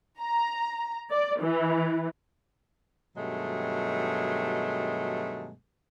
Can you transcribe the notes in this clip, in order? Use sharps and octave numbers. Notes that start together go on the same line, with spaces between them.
A#5
D5
E3
G2 B2 D#3 F#3 G#3 A3